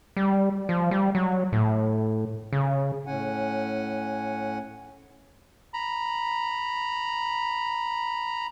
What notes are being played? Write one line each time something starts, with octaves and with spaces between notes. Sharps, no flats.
G3
F3
G3
F#3
A2
C#3
A2 C#4 F#5 G#5
A#5 B5